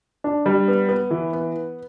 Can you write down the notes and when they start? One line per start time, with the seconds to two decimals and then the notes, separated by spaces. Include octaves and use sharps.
0.24 D4
0.46 G3
0.68 B3
0.89 B3
1.11 E3
1.33 B3